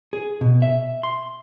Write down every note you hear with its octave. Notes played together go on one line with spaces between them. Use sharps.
G#4
B2
E5
C6